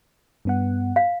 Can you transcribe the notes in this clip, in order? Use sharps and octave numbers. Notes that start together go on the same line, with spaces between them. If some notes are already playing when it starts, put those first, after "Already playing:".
G2 B3 F#5
F5